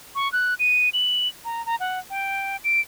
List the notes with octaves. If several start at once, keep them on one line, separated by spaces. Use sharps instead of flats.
C#6
F#6
D#7
F#7
A#5
A#5
F#5
G5
D7